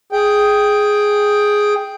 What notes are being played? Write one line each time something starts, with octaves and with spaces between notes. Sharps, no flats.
G#4 G5